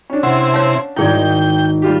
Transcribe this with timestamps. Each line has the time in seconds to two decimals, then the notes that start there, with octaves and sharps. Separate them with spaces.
0.10 C#4 D4
0.23 C3 C4 E4 F#5
0.54 C#5 F5 A5
0.97 G#1 D#4 E4 G#4 D5 G5
1.82 G3 F4 G4